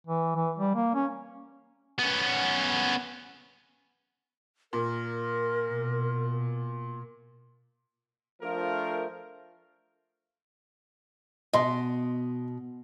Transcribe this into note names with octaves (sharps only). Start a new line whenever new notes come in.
E3
E3
G3
A#3
C#4
B3 C#4
A#2 A#4
B2
F3 A3 D4 A#4
B2 D#5 C6